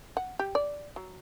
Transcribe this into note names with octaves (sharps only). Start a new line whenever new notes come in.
F#5
G4
D5
F#3